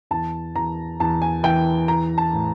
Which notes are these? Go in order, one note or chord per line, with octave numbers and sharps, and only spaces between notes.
E2 A5
E2 A#5
E2 A5
G#5
E3 G5
E3 A#5
A5
A2